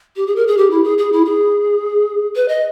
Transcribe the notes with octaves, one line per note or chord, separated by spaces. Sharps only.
G4
G#4
A#4
G#4
G4
E4
G#4
G#4
E4
G#4
B4
D#5